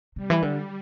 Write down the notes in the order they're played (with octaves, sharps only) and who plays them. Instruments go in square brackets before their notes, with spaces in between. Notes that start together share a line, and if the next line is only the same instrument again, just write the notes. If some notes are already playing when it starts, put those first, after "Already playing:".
[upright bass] C3 [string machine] G3
[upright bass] E3
D3